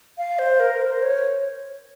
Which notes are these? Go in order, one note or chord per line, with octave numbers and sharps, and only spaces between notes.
F5
C5
A#4
C5
C#5